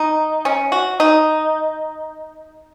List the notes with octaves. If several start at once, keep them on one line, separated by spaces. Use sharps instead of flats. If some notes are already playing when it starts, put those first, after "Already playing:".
Already playing: D#4
C#4
F#4
D#4